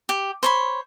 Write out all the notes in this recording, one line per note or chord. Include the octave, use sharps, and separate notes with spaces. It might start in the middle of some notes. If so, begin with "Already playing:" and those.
G4
C5 C#5 B5